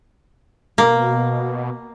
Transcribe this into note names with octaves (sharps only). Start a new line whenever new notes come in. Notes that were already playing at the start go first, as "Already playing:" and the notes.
B2 A#3